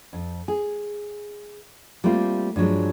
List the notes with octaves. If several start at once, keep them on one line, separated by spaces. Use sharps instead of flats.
F2
G#4
G3 A3 A#3 C4 F4
G2 F3 F#3 G#3